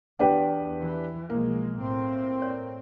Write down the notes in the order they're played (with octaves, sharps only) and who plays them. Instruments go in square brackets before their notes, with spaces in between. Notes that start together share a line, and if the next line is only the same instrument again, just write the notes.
[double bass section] E2 [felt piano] D4 G4 B4 [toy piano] F#5 G5
[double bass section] E3
[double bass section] B1 F3 G#3 [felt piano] A#3
[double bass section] A2 C4
[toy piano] C#5 D5